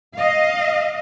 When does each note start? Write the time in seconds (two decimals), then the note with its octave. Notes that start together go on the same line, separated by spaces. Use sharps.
0.15 D#5 F5